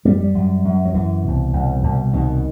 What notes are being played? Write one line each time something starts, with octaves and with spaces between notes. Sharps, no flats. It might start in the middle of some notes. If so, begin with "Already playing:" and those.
F#2 G3
G3
F#2
F#2
F#3
F#2 E3
C2 B2
C2 B2
C2 B2
C2 B2 D#3